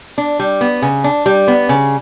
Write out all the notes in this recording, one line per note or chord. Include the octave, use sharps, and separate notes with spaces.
D4
G3
B3
C#3
D4
G3
B3
C#3